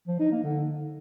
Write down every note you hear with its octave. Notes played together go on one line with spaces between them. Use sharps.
F3
D#4
A#3
D3